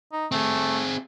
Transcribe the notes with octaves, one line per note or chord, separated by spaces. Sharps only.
D#4
A3 C4 G#4